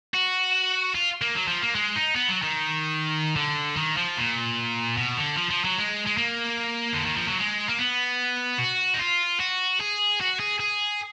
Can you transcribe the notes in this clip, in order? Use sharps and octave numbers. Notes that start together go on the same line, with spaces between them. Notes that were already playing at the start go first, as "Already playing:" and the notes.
F#4
F4
A#3
F#3
F3
A#3
G#3
D#4
B3
F#3
D#3
D3
D#3
F3
A#2
B2
D3
F3
F3
F#3
G#3
G#3
A#3
D3
D#3
F3
F#3
G#3
A#3
B3
F#4
D#4
F4
F#4
G#4
F#4
G#4
G#4